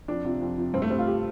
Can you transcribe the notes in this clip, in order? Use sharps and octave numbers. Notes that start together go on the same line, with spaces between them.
F2 D4
C3 F3
F2
C3 F3
G2 C4
A3
G3 C4
F4
G4